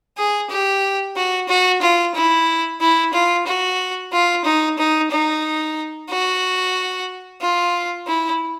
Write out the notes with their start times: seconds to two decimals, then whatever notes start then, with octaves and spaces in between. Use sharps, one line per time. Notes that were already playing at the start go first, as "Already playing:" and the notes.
0.17 G#4
0.50 G4
1.16 F#4
1.49 F#4
1.82 F4
2.15 E4
2.80 E4
3.13 F4
3.46 F#4
4.12 F4
4.45 D#4
4.78 D#4
5.11 D#4
6.09 F#4
7.41 F4
8.07 E4